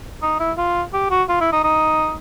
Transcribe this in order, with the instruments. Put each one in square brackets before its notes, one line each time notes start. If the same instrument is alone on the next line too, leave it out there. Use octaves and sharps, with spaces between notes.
[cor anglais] D#4
E4
F4
G4
F#4
F4
E4
D#4
D#4